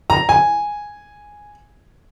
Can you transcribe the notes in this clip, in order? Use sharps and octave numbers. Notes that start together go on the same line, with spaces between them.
A#5
G#5